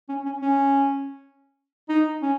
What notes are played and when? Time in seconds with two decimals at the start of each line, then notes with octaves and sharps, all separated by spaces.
0.09 C#4
0.26 C#4
0.42 C#4
1.89 D#4
2.22 C#4